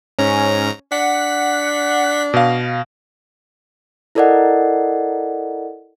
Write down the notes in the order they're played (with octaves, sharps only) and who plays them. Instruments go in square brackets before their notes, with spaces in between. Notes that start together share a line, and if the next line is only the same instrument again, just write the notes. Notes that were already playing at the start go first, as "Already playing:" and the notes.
[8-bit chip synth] G#2 A#5 [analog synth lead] C#4
[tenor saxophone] D4 [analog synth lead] F#5 [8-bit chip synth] B6
[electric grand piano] B2 F5
[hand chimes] E4 A4 A#4 D5 D#5 F#5